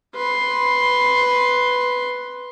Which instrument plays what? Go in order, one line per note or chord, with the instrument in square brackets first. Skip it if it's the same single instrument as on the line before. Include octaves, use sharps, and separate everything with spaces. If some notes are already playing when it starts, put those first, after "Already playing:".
[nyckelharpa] B4 C6